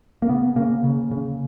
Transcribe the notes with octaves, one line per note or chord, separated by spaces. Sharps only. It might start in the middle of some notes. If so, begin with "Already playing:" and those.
A#3
C#3 B3
C#3 A#3
C#3
C#3